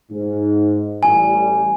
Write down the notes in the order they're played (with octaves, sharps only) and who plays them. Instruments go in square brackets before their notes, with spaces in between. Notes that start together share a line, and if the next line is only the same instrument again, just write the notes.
[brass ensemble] G#2
[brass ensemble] A1 G3 [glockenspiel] G#5